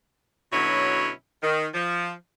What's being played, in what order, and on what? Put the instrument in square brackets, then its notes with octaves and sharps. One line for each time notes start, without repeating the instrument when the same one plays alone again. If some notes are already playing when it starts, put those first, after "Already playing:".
[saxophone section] B2 D3 F#3 C#4 E4 C#5
D#3
F3